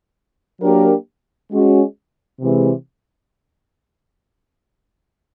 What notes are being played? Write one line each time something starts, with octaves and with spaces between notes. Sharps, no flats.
F#3 A#3 D4 G4 A#4
G#3 C#4 F#4
C3 E3 G#3